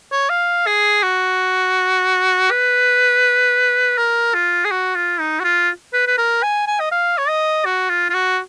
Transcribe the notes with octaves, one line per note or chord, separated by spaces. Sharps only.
C#5
F5
G#4
F#4
B4
A#4
F4
G#4
F#4
F4
D#4
F#4
F4
B4
B4
A#4
G#5
G#5
D#5
F5
C#5
D#5
F#4
F4
F4
F#4